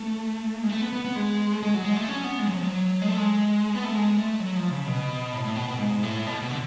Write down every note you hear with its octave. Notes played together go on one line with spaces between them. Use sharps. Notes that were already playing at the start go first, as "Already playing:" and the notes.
Already playing: A3
G#3
A3
B3
B3
B3
G#3
G#3
F#3
G#3
A3
C#4
B3
G#3
F#3
F3
F#3
G#3
A3
G#3
B3
A3
G#3
A3
F#3
F3
C#3
B2
A2
A2
B2
B2
G#2
A2
B2
B2
D3